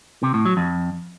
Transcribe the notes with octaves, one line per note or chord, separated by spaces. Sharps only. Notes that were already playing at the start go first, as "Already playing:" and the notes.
C3
A2
F#3
F2